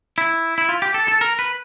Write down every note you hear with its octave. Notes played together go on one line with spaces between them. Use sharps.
E4
E4
F4
G4
A4
A4
A#4
B4